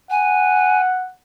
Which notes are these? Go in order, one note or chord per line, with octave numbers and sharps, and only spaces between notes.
F#5 G#5